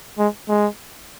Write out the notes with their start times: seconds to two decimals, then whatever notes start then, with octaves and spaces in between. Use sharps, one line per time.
0.19 G#3
0.49 G#3